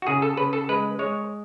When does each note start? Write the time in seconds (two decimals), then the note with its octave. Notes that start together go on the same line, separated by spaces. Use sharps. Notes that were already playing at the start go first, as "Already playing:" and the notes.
0.02 F#4
0.07 C#3 G#4
0.22 A4
0.37 C#3 B4
0.53 A4
0.69 G#3 B4
0.99 G#3 C#5